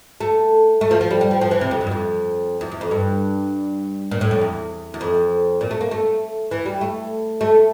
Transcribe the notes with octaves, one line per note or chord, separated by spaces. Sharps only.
A3
A3
F3
F3
G3
G3
F3
F3
E3
C3
F2
G2
E2
F2
E2
E2
F2
G2
A#2
A2
F2
E2
E2
F2
A#2
A3
A#3
A3
E3
G3
A3
A3